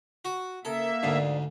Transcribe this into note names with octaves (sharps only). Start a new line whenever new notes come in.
F#4
C#3 A#3 A4 A#4 E5
D2 G#2 D4 F5